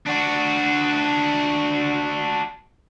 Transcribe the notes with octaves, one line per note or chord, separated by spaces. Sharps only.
D4 F#4